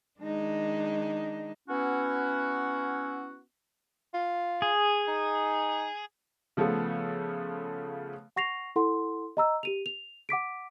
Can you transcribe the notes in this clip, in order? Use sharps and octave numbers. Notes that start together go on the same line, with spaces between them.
D#3 G#3 D4 D#4
B3 C#4 E4 F#4
F4
G#4
D#4
C#3 F3 A3 B3 A4
F#5 C#6 A#6 C7 F7
E4 A4 F#5 C6
D#5 A#5 E6
G4 D#7 F7
F7
F#5 D6 B6 D7